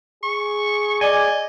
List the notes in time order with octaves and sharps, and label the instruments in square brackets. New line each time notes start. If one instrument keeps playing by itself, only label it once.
[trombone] G#4 [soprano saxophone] C#6
[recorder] D5 [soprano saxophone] D#5 [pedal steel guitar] G#5